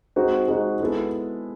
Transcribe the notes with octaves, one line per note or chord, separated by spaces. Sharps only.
G#3 C4 D#4 F#4
G#3 C4 D#4 F#4
G#3 B3 E4 A4